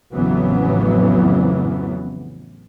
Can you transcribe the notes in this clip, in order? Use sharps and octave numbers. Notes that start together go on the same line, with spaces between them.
A1 F2 C#3 E3 F#3 B3